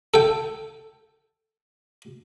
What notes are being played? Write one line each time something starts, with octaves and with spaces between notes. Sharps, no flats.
A4 G5